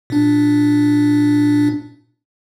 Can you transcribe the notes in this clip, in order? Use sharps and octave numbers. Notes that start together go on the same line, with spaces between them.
A#2 D4